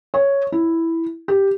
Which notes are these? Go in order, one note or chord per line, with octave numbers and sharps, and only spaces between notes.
C#5
E4
G4